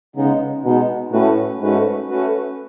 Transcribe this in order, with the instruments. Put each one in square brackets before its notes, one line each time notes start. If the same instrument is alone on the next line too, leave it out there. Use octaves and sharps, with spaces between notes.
[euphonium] C#3 [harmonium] G#3 B3 D#4
[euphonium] B2 [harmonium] G#3 B3 D#4
[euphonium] A2 [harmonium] A3 C#4 F#4 B4
[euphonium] G#2 [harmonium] A3 C#4 F#4 B4
[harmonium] A3 C#4 F#4 B4